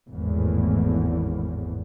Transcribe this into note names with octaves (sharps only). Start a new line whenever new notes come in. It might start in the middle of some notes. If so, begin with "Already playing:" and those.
G#1 E2 A2